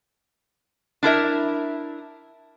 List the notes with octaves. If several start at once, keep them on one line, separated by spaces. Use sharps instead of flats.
D4 E4 A#4 E5